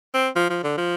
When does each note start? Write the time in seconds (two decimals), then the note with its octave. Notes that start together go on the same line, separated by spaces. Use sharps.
0.14 C4
0.36 F3
0.49 F3
0.64 D3
0.77 F3